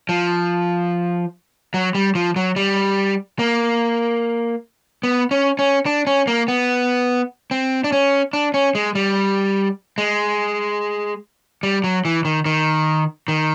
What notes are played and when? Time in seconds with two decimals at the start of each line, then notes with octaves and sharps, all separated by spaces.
0.09 F3
1.74 F#3
1.95 G3
2.15 F3
2.36 F#3
2.56 G3
3.39 A#3
5.03 B3
5.31 C#4
5.59 C#4
5.86 D4
6.07 C#4
6.27 A#3
6.48 B3
7.51 C4
7.84 D4
7.92 C#4
8.33 D4
8.54 C#4
8.75 G#3
8.95 G3
9.98 G#3
11.63 G3
11.84 F#3
12.05 E3
12.25 D#3
12.46 D#3
13.28 D#3